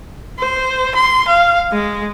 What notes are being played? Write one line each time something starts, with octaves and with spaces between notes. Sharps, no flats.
C5
C6
F5
G#3